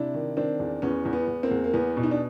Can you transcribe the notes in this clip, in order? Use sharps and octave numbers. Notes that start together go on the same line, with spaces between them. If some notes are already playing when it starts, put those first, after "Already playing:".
Already playing: C3 D4 E4
D#3
D#3 C4 D4
E2
E2 B3 C#4
E2
B3
E2
A#3 C4
E2
A#3
E2 B3
B2
D#4
D4